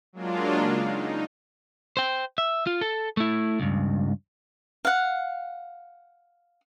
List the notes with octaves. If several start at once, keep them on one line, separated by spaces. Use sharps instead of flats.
F#3 G#3 A#3 D4 F4
C#3
D#4
C5 G5
E5
F4
A4
A3 E4
C#2 G2
F5 F#5